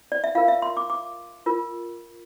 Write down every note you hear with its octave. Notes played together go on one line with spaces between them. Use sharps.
D5
E5
F4 A#4 F5
E5
C6
D6
D6
F4 A#4